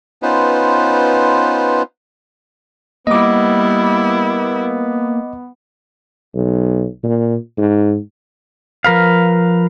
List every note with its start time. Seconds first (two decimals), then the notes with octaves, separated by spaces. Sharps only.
0.22 B3 C#4 D#4 F4 B4 C5
3.07 G3 A#3 B3 E4 D#5 D6
6.34 B1
7.04 A#2
7.57 G#2
8.84 F3 A#4 B4 F5